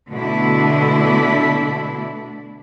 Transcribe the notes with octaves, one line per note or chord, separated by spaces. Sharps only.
B2 D3 A3 D4 E4